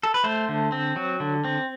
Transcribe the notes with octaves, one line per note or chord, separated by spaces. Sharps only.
A4
B4
A3 C5
D3
C4
F#3
D3
C4